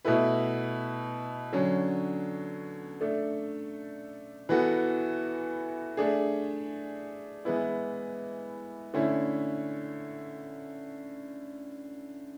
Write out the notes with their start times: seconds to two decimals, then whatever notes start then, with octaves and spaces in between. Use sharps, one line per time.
0.05 B2 A3 E4 B4
1.52 D3 F#3 C#4
3.01 A3 D4 A4
4.49 E3 B3 F#4 A4
5.97 A3 D4 G#4
7.45 E3 G#3 B3 E4
8.94 D3 A3 C#4 E4